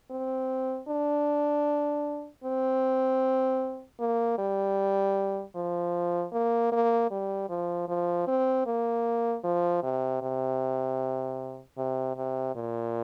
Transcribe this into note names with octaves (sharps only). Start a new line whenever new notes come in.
C4
D4
C4
A#3
G3
F3
A#3
A#3
G3
F3
F3
C4
A#3
F3
C3
C3
C3
C3
A#2